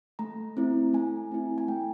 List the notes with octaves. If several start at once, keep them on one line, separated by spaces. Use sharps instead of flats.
A3 A#5
C4 E4
A3 G#5
C4 E4
G#5
A3 G5